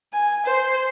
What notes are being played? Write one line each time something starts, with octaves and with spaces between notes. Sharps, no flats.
G#5
C5